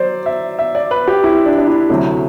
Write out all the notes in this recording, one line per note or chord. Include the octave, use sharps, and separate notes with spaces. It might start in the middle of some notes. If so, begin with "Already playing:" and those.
Already playing: F#3 C5 D5
E5
E5
D5
B4
G4
E4
D4
D4
E4
D2 C3 F#3 A3